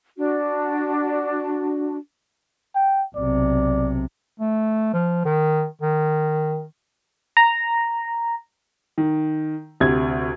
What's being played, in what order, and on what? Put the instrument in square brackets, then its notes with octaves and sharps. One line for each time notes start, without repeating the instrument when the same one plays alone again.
[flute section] D4 F#4
[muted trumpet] G5
[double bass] B1 C3 [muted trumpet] D5
[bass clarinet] A3
F3
D#3
D#3
[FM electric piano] A#5
[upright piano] D#3
D2 C3 G#6